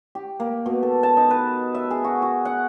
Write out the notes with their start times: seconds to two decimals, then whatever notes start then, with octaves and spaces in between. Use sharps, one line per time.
0.15 G4
0.40 A#3
0.66 B2
0.83 A4
1.03 A5
1.17 D#4
1.31 B4
1.75 E5
1.91 G#4
2.04 F#4
2.22 F#4
2.45 F#5